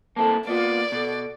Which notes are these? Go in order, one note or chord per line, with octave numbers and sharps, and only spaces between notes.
A#3 C4 E4 A4 A5
A#3 B3 F4 D5
B2 A4